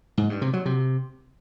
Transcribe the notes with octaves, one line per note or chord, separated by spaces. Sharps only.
G#2
G2
C3
F#3
C3